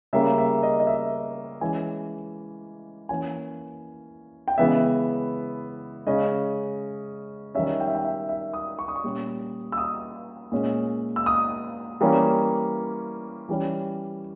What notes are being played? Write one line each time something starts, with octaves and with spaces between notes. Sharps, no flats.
C#3 G3 A#3 C#4 E5
E5
D#5
D#5
E5
E3 G#3 C#4 G#5
E3 A#3 C#4 G#5
G5
C#3 E3 G#3 B3 E5
C#3 G#3 C#4 D#5
D#3 G3 C#4 E5
G5
E5
G5
E5
E5
D#6
C#6
D#6
C#6
A#2 G3 C#4
E6
D#6
A#2 G#3 C#4
E6
D#6
E3 G3 A#3 C#4
E3 G3 C#4